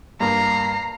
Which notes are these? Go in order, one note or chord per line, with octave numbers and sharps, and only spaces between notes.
G2 A#3 A#5 C7